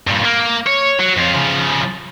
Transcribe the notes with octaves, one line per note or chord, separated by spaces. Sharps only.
G2 A#2
A#3
C#5
F#3
F2 F4
C#3 F3